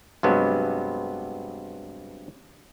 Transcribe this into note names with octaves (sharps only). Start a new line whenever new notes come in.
G2 C3 F#3 G#3 B3